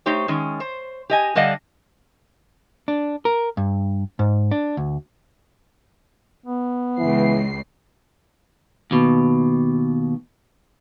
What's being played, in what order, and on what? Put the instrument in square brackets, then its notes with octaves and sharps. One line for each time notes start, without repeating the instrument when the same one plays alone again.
[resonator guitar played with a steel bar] A3 D#4 G4 C5 C#5
D#3 G#3 C#4
C5
G4 D#5 G#5
D3 G3 D4 D#5 F5 F#5
[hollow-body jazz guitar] D4
A#4
G2
G#2
D4
D2
[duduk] B3
[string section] C#2 C7 [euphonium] E3
[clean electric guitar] D#2 B2